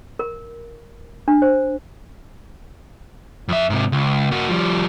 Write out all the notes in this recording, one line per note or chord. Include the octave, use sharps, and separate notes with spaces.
A#4
D4
C5
F2 E5
G#2 C3
C#2
A#3 F#4
F3 G3